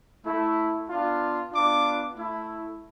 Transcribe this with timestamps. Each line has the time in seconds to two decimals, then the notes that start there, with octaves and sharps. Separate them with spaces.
0.25 A3 E4
0.88 B3 D4 F4
1.51 B3 D4 F4 D6
2.15 A3 E4